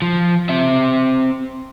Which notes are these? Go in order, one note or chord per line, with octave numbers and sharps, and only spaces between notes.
F3
C4 E5